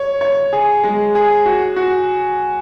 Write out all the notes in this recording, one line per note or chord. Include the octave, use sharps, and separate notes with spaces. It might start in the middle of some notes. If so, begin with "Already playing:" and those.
Already playing: C#5
C#5
G#4
G#3
G#4
F#4
F#4